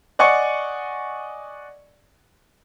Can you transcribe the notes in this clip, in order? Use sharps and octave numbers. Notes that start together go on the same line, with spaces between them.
D5 D#5 F#5 G#5 C#6 C#7